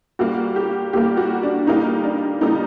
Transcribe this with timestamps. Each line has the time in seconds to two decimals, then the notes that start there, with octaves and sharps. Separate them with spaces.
0.19 A#2 G3 A#3 F#4
0.56 G4
0.93 A#2 G3 A#3 G4
1.17 F#4
1.43 D4
1.67 A#2 G3 A#3 D#4
2.04 D4
2.41 A#2 G3 A#3 D#4